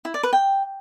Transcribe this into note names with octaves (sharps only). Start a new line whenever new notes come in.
E4
D5
B4
G5